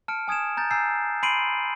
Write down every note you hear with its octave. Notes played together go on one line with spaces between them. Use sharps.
A5 F6 C#7 D7
G#5 D#6 G#6 D7 E7
A#5 G6 A6
G#5 A#5 E6 G6 C7
B5 C6 C7 D7 D#7 F#7